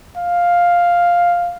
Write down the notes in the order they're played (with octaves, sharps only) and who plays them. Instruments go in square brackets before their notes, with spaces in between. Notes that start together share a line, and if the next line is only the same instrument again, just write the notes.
[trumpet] F5